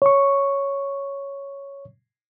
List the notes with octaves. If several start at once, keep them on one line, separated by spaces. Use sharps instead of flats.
C#5 C#6